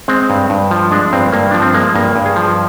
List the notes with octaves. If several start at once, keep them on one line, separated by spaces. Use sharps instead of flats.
G#3 C4
G2
G2
F3
G#3 D4
G2 C4
G2 A#3
F3 D4
C4
G#3 A#3
G2 A#3
G2
G#4
F3